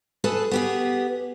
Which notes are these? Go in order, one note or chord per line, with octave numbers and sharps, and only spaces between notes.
G#4 A4 B4 A5
B3 G4 G#4